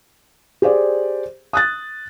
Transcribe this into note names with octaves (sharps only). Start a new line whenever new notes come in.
G4 G#4 C5 D5
D#6 F#6 A6